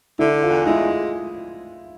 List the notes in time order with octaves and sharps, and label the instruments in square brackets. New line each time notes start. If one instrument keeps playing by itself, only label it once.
[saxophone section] D3 [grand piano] E4
[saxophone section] E2 [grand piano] F4
[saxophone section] G#3 [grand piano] E4